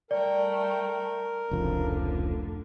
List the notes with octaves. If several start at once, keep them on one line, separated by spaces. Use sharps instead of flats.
G3 A3 A#4 D5 G5
F1 C#2 A2 D3 F3